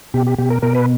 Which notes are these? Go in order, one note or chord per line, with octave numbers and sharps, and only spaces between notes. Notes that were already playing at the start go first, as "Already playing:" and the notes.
B2 G4
G4
B2 G4
A#4
B2 A#4
B4